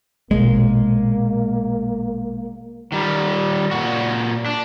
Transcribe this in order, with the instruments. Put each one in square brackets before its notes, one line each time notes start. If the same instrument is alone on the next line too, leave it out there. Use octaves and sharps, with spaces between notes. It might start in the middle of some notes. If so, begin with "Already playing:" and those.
[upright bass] A#1 B2 [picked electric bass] G#3 [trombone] A#3
[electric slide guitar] D#3 G3
A#2 F#4
D4